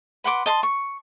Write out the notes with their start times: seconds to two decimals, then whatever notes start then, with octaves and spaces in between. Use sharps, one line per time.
0.24 B4 F#5 C6 D6
0.46 D#5 A5 C6
0.63 C#6